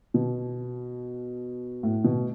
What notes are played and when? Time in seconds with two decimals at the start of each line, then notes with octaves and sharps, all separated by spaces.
0.14 B2
1.83 A2
2.04 B2